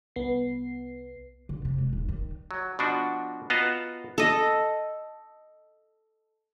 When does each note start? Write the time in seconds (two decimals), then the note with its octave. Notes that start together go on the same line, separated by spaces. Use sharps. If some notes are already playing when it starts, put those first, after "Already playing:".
0.16 C2 B3 C7
1.49 D3
1.65 C3
1.78 G#3
1.93 D#1
2.08 D#3
2.51 F#3
2.79 B2 F3 D4 F#4
3.50 B3 F4 F#4 D#5 A5 A#5
4.18 A4 D#5